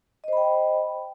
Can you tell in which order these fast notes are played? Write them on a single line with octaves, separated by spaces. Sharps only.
D#5 C5 B5 G5